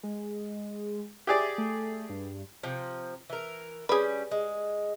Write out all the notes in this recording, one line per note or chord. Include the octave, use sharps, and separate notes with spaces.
G#3
G4 G#4 D5 E5
A3
G2
C3 F3
E3 A#4
G3 C#4 G#4 B4
G#3